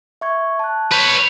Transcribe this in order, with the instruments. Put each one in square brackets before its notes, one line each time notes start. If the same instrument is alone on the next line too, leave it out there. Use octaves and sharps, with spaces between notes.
[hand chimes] E5 C#6 G#6
A5 F#6
[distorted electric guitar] B4 C#5 [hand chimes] G6 C#7